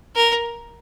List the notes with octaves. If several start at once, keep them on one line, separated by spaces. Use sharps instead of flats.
A#4